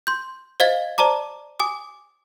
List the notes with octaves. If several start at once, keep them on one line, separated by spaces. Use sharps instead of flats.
C6 G6
C5 D#5 F5 G#6 A6 G7
C5 D5 A5 A#5 D6
G#5 D6 D#6